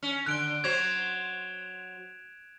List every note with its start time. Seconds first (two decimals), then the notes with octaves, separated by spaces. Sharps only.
0.02 C#4
0.26 D3 F#6 D7 G7
0.64 F#3 F#4 C5 G#6 E7 F7